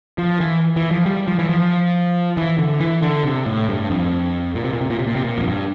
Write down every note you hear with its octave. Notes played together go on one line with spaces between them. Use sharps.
F3
E3
E3
F3
G3
F3
E3
F3
E3
D3
E3
D3
C3
A2
G2
F2
A#2
C3
A#2
C3
A#2
C3
A#2
C3
A#2
F2
G2